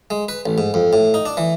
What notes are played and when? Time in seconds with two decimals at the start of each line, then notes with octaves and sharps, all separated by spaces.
0.10 G#3
0.29 B4
0.46 A1
0.58 G#2
0.74 F2
0.93 A2
1.14 D#4
1.26 D4
1.37 E3